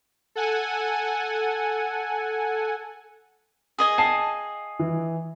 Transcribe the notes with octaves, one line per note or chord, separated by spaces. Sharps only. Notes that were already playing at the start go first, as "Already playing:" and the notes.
A4 F#5 G#5
G#4 D#5 G#5
F5 G5 A5 C7
E3